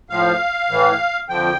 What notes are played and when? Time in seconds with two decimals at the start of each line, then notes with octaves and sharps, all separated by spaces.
0.10 A2 F3 F5
0.70 A2 E3
1.29 F2 D3 F3 G5